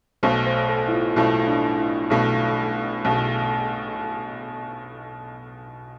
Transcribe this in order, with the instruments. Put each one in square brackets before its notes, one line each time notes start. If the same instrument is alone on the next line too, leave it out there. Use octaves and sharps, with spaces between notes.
[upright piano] B1 B2 A3 [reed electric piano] C5
[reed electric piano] C5
A4
E4
F4
[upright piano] B1 B2 A3 [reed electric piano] E4
[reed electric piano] D4
E4
[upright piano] B1 B2 A3
B1 B2 A3